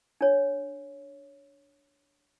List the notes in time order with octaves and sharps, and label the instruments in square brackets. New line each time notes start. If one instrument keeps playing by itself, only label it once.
[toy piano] D4 C#5